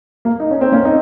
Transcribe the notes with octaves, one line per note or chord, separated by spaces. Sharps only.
A#3
D#4
C#4
C4
A#3 C#4
C4 D#4